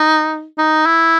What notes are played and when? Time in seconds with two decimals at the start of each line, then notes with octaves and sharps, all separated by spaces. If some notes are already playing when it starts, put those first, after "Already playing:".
Already playing: D#4
0.58 D#4
0.86 E4